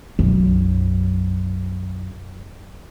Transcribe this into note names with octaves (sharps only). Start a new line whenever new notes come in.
B1 F#2